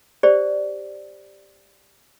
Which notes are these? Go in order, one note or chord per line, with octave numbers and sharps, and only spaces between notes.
G4 C5 D5